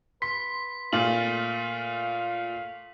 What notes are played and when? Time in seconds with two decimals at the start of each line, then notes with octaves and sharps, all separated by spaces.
0.22 B4 C6 B6
0.93 A#2 A3 F4 F5 F#7